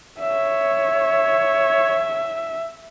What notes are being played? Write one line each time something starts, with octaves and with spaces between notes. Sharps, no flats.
C#5 E5